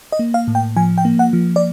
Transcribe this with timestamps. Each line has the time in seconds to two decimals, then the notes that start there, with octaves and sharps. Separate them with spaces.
0.12 D#5
0.19 A#3
0.34 F5
0.48 A2
0.55 G5
0.76 F3 G#5
0.98 G5
1.05 A#3
1.19 F#5
1.33 F3
1.56 D5